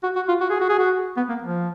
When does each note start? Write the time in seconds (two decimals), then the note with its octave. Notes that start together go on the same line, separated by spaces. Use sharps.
0.03 F#4
0.16 F#4
0.28 F4
0.41 F#4
0.50 G#4
0.60 F#4
0.69 G#4
0.79 F#4
1.17 B3
1.29 A#3
1.42 F3